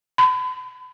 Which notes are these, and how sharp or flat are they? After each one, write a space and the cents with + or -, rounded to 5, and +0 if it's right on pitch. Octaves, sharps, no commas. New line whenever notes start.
B5 +35